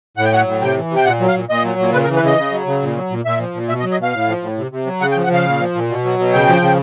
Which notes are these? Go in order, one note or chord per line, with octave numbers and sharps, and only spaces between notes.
A2 F#5
G5
F#3 F#5
A2
C3 G5
E3
C3
G5
A#2 F#5
F#3
F5
A#2
A#2 D#5
F#3
A#2
C#3 B4
A#4
E3
B4
C#3 D#5
C#3
F#3
C#3
A#2
F#3
A#2
A#2 E5
F3
A#2
B2 E5
D#5
F#3
D#5
B2 F5
A2
F3
A2
C3
C3
F#3
C#3 F#5
G5
F3
F#5
C#3 F5
A#2
F3
A#2
B2
F#3
B2
C#3 G5
F3
C#3